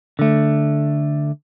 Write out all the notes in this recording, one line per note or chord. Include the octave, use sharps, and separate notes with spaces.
D3 A3